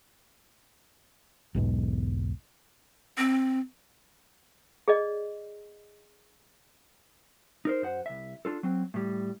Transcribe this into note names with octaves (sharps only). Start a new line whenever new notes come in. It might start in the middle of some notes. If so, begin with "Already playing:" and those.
B1 E2 G#2 B2
C4
G#4 D5 D#5
D#4 A#4 C5
F#2 C5 F#5
C2 E5
D4 F4 A4
F#3 C4
A2 G3